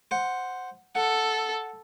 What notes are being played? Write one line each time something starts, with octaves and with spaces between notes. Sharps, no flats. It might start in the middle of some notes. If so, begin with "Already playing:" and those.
C5 F#5
A4 F#5